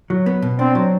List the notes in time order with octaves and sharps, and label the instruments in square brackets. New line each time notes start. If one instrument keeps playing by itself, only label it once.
[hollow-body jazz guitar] F#3
B3
B2
[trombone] C4 [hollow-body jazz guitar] D4
[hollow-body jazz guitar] F#3